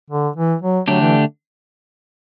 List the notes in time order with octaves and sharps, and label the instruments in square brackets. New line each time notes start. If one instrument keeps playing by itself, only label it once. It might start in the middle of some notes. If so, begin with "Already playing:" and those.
[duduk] D3
E3
F#3
[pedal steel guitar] D3 A3 D4 G4 [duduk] F#3
[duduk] E3